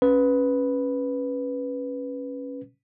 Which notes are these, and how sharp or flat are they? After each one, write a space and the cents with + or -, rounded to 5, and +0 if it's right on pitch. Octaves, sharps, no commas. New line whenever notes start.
C#4 -10 B4 +0